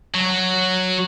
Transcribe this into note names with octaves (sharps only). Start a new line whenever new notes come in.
F#3